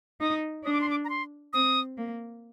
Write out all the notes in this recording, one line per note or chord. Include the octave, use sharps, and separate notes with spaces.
D#4 D#6
D4 D#6
D6
C6
D6
A#5
C6
C4 D#6
A#3